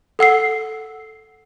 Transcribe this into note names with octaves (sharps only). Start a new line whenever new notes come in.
A4 F#5 E6 C7